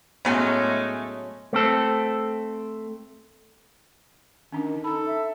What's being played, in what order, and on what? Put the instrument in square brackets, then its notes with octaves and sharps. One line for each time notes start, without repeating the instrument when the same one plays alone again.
[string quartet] A2 G#3 A3 [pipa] C#3 F#3 C#4 [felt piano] B3
[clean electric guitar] A3 C4 A4
[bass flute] D#3 [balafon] C#4 D4
[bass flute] D#4 [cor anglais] A4 [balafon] A5 B5
[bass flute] E5